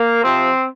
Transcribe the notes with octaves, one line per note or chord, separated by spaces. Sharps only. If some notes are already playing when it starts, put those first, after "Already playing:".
Already playing: A#3
C3 F3 C4